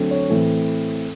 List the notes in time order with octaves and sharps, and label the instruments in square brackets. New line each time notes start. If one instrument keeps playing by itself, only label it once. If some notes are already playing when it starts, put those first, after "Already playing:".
Already playing: [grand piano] D3 F#3 A3 C4
C#5
A2 E3 A3 C4 A4